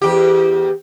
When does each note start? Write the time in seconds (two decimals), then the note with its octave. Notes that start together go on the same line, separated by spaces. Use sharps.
0.02 E2 G4